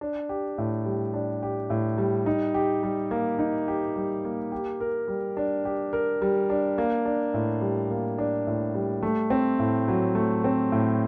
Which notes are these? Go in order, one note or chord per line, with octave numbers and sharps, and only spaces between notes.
D4
G4
A2
G3
D4
G4
A2
G3
D#4
G4
G3
A#3
D#4
G4
G3
A#3
G4
A#4
G3
D4
G4
A#4
G3
D4
A#3
D4
A2
G3
A#3
D4
A2
G3
A3
C4
A2
F#3
A3
C4
A2